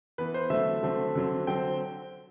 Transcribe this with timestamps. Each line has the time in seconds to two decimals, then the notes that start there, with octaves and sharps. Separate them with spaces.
0.18 E3 B3 B4
0.34 C5
0.50 D3 F#3 A3 C4 E5
0.83 D3 F#3 A3 C4
1.15 D3 F#3 C4
1.47 D3 F#3 C4 G5